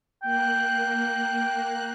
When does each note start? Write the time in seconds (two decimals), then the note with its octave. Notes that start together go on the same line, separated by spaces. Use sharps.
0.23 A#3 G5 F#6